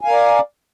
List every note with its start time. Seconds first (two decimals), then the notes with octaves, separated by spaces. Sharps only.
0.01 G#5
0.05 F5
0.08 A#4
0.11 D5